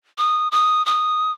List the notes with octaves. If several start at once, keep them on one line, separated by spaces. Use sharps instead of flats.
D#6
D#6
D#6